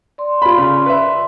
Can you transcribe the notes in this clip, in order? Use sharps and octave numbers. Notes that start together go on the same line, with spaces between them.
D5 C6
F4 B5
C#3
B4 E5